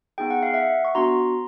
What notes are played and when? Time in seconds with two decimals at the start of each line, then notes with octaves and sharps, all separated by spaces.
0.18 B3 D#4 G#4 G5
0.30 F#5
0.43 F5
0.54 E5 F#5
0.85 C#6
0.95 B3 D4 F#4 A#5 C6